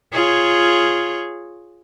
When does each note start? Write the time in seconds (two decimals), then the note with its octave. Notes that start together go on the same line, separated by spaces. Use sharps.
0.12 F4 G#4 C#5